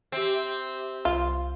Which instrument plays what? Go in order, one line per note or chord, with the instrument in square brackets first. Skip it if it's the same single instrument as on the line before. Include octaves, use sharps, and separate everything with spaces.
[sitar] C4 [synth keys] G4 E5
[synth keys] C2 F5 [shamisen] F4